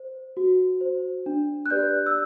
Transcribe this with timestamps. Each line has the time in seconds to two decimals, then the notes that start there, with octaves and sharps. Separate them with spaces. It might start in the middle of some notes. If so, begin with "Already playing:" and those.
Already playing: C5
0.37 F#4
0.81 C5
1.26 D4
1.66 F#6
1.70 G4 B4 D5 G6
2.06 E6